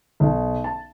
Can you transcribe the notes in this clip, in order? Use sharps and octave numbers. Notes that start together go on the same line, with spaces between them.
B1
A5